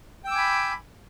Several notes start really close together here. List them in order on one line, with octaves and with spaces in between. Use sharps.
G5 E6 D6 G#5 B5